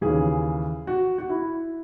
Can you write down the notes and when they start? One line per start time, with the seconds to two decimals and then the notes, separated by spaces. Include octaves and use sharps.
0.01 D#2 C#3 E3 G#4
0.87 F#4
1.18 F#4
1.29 E4